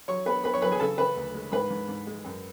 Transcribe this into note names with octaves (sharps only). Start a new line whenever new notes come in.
F#3 C#5 C#6
B3 B4 B5
B3 B4 B5
C#5 C#6
F#3 B4 B5
G#4 G#5
C#3 A4 A5
C#3 B4 B5
D2
G#3
G#2 B4 B5
G#2
G#2
G#3
F#2